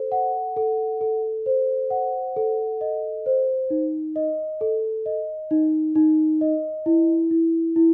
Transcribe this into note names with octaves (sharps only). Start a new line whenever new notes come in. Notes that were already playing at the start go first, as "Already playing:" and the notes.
Already playing: A4 C5
F#5
A4
A4
C5
F#5
A4
D#5
C5
D#4
D#5
A4
D#5
D#4
D#4
D#5
E4
E4
E4